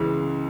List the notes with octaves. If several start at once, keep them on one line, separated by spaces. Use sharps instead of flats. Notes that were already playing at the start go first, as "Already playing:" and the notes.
Already playing: C#2 C#3 E3